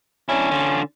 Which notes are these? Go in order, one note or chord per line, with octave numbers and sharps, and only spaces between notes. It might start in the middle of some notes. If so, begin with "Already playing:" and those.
C#4 D4 E4
D3 F4